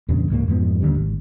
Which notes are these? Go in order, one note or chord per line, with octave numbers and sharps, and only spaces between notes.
E2 G2 A#2 C#3
C#2 G#2 F#3 A#3
F2 G#2 F3 B3
D#2 D3 G3
G#1